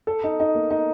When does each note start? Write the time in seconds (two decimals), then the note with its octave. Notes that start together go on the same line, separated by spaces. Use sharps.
0.07 A4
0.24 D#4
0.40 D#4
0.55 A#3
0.71 D#4